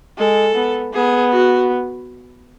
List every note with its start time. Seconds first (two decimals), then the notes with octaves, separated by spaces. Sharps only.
0.18 G#3 A4
0.55 B3
0.93 B3 G#4
1.32 F#4